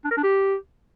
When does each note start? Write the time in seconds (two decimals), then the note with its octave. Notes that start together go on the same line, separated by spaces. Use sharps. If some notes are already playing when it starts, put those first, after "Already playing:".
0.04 D4
0.11 A#4
0.17 D4
0.23 G4